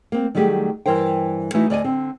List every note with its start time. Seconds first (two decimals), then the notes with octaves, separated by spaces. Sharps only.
0.12 A#3 C4
0.35 D#3 F#3 G3 A3 G4 G#4
0.86 G2 E3 A#4 C5 G5
1.54 E3 A3 D#4 E4 F#4
1.70 D2 D5 D#5 G#5
1.84 D3 C4